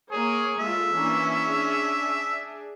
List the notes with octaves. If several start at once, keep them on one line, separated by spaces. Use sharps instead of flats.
A#3 G#4 A#4 C#5
G#3 F4 A4 E5
E3 A#3 C#4 D4
D4 G#4